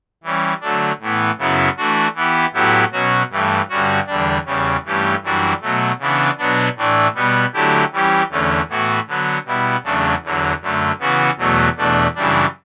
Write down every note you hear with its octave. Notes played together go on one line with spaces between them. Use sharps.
E3 G3 C#4
D3 F#3 A3 D4
A2 E3 B3
F#2 C#3 F#3 B3 E4
E3 A3 D4 F#4
E3 B3 E4 G4
A2 F#3 B3 E4 G4
B2 F#3 C#4 F#4
G2 E3 A3
G2 D3 G3 C#4 F#4
E2 D3 G3 D4
E2 C#3 G3 C#4
G2 E3 A3 C#4 G4
F#2 E3 G3 D4 F#4
B2 F#3 A3
C#3 E3 B3 D4
B2 F#3 B3 D4
A2 E3 A3 D4
B2 G3 B3
D3 F#3 A3 E4 G4
E3 G3 C#4 G4
E2 D3 A3 C#4
A2 E3 B3 F#4
D3 F#3 B3
B2 G3 B3 E4
E2 C#3 F#3 A3 D4
E2 D3 F#3
F#2 D3 A3
C#3 E3 B3 F#4
E2 B2 F#3 A3
E2 B2 A3 D4
F#2 C#3 E3 G3 D4